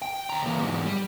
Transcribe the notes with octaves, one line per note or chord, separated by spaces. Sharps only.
G5
D2 A#5
E3 A#3
E2 G#2
G3